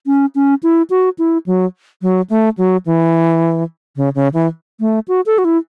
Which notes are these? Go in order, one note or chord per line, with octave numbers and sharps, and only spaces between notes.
C#4
C#4
E4
F#4
E4
F#3
F#3
A3
F#3
E3
C#3
C#3
E3
A3
F#4
A4
F#4
E4